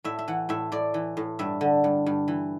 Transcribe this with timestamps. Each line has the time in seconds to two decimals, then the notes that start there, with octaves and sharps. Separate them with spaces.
0.04 A2 E5
0.19 E5
0.28 E3 F#5
0.49 A2 E5
0.72 A2 D5
0.94 E3
1.17 A2
1.39 G2 E5
1.61 D3
1.84 G2
2.06 G2
2.28 E3